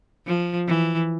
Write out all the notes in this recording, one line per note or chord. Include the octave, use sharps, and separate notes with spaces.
F3
E3